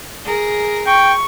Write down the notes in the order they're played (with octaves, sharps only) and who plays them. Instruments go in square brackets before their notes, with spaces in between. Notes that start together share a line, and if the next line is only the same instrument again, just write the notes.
[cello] G#4 A#4
[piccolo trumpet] G5 [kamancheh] C#6